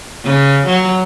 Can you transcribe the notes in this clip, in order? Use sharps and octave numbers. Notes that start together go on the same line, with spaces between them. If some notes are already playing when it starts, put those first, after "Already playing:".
C#3
F#3